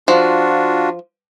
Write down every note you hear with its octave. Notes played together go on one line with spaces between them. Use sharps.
F3 D4 F4 F#4